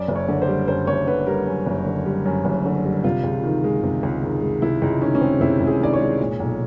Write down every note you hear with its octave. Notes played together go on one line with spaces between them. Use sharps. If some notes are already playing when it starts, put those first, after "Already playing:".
Already playing: F#2 D5
F#1
C#5
D3
C5
G3
F#2 C5
F#1 C#5
D3 B4
G3 A#4
F#2
F#1
D3
G3
F#2
F#1
D3
G3
C3 F4
C#2
D#3
G#3
C3
C#2
D#3
G#3
C3 E4
C#2 D#4
D#3 C#4
C#4
G#3 C4
C3 E4
C#2
G#4
D#3 D5
C#5
G#3
A#2
B1